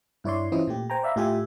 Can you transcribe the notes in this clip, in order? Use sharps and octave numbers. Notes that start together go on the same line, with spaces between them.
G2 E4 C#5 D5 C6
E3 C#4 E4 F4 C5 D#5
A#2 A3 G4
C5 G5 G#5 A#5
D5 E5 F5 A#5 B5
A2 A3 F4 G4 E5 G#5